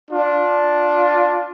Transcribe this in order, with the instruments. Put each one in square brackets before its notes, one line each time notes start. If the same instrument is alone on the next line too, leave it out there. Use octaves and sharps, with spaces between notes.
[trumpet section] D4 F4